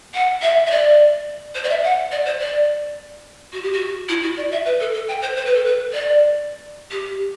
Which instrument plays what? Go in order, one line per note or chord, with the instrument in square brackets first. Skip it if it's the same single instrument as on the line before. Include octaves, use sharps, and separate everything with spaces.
[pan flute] F#5
E5
E5
D5
C5
D5
E5
F#5
D5
C5
D5
F#4
G4
F#4
E4
F#4
D5
E5
B4
A4
A4
G5
C5
C5
B4
A4
B4
D5
G4